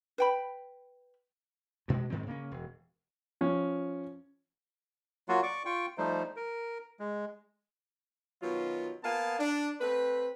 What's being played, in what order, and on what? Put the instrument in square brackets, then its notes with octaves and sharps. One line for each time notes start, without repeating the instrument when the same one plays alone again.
[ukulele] B4 G5 B5
[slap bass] G2 B2 G#3
G#2 D#3 F#3 C4
C#3 A#3 C4 C#4
E1
[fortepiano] F3 C#4
[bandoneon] F#3 A#3 F4 F#4
D5 C#6 D6
F4 G5 C#6
F3 G3 A3 D#4 C5
A#4
G#3
[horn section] B2 D#3 F#3 F4
A#3 B3 F5 G#5 A5
D4
A3 C4 B4